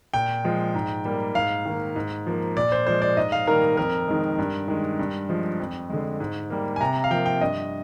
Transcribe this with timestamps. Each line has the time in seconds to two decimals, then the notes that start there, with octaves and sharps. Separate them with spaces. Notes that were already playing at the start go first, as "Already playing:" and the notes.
0.14 A#2 G5
0.45 F3 G#3
0.75 G#2
1.05 G3 A#3
1.35 G#2 F5
1.65 D#3 A#3
1.96 G#2
2.26 F3 A#3
2.57 A#2 D5
2.72 C5
2.87 F3 G#3 C5
3.02 D5
3.17 G#2 D#5
3.32 F5
3.47 D#3 G3 A#3 A#4
3.77 F2 A#4
4.08 D#3 G#3
4.38 G2
4.68 D#3 G#3
4.99 G2
5.29 F3 G#3
5.60 F2
5.90 D3 G#3
6.20 G#2
6.50 G3 A#3
6.76 G#5
6.81 C3 A#5
7.04 F5
7.11 F3 A#3 G5
7.26 G5
7.41 G2 D#5